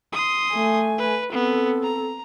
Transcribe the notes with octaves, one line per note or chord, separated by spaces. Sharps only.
C6 D#6
A3 G#5
B4
B3 C4 A4
A#5